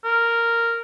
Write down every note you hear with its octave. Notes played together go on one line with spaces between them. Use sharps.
A#4